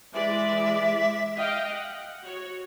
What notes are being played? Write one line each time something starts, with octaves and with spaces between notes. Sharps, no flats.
E3 G#3 D5 E5
D#5 F5 G5
F#5
F#4 C#5